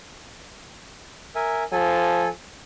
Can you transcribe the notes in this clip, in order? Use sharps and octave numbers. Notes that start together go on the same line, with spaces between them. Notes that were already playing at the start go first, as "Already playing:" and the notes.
A#4 E5 G#5
F3 A4 G#5